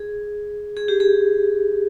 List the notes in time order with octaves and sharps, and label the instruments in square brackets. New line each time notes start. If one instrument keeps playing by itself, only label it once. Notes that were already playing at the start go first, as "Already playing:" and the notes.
Already playing: [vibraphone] G#4
G#4
G4
G#4